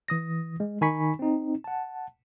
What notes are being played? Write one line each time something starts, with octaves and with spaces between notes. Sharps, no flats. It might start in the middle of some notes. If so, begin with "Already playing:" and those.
E3 D#6 A#6
G#3
D#3 D#4 G#5 B5 C#6 B6
C4 D#4
F#5 A5